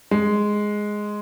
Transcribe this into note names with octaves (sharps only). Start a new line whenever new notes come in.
G#3